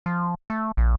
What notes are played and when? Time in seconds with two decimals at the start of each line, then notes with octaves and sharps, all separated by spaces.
0.06 F3
0.50 A3
0.77 A#1